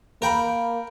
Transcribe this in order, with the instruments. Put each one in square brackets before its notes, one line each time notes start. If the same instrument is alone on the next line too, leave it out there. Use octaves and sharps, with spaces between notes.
[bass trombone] A#3 [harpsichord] A#4 G5 B5